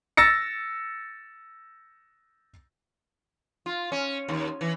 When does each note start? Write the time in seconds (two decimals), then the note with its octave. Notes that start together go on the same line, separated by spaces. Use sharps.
0.17 E6 A6 A#6 C#7
3.66 F4
3.92 C#4
4.29 D#2
4.61 E3